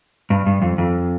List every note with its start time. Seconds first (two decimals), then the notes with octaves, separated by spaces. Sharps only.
0.30 G2
0.46 G2
0.62 F2
0.78 F2